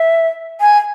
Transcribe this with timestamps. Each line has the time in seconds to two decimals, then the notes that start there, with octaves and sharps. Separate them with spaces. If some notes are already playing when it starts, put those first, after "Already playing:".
Already playing: E5
0.61 G#5